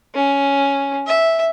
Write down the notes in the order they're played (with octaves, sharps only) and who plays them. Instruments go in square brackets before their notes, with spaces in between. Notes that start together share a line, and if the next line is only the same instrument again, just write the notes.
[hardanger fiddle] C#4
E5